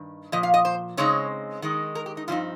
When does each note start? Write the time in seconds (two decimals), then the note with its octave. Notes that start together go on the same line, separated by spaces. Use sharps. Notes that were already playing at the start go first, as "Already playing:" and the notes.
Already playing: G2 D#3
0.32 A#2 F3 D#5
0.43 F5
0.54 D#5
0.65 C5
0.97 C#3 G#3 C4 D#4 C#5
1.62 D#3 G#3 D#4
1.95 A#4
2.06 G4
2.17 D#4
2.28 G2 F3 C4 D#4 F4